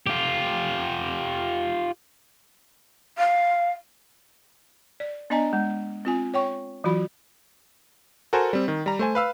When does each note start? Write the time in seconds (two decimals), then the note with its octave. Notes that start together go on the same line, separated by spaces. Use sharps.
0.07 F4 G4
3.18 F5
5.00 D5
5.30 B3 D4 D5 D#5 G#5 A#5
5.53 G#3
6.05 C4 F4 G#5
6.34 C#5 G5 C#6
6.84 E3 F#3 F4 F#4 B5
8.33 F#4 A4 A#4 C5 G#5
8.53 G3 C4
8.68 D#3
8.86 G3 A#5
8.99 A3 C5 G#5
9.15 B4 F5 E6